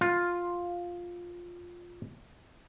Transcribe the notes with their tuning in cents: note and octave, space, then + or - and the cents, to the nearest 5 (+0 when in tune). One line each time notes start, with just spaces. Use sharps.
F4 +5